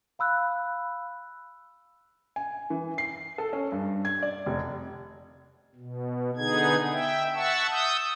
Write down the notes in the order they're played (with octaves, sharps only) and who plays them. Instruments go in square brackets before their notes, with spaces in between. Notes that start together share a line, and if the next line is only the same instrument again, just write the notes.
[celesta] F5 B5 E6 F#6
[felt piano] G#5
E3
C7
A4
C#4
G2
G#6
D5
F1
[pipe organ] B2
D3 B3 D#4 G#4 G#6
E5 G5
E5 F#5 A5 C#6 E6
D#6 E6 G6